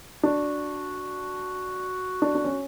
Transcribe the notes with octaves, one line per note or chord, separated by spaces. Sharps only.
D4 F#4
D4
D4
C#4